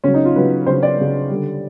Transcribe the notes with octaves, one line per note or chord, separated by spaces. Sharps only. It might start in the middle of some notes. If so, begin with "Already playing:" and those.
C#3 F#3 C#4
D#4
F4
C#3 F#3 B4
C#3 F#3 C5
D5
C#3 F#3
D3 G3